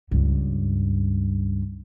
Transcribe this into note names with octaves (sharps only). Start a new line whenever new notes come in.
C#2 G2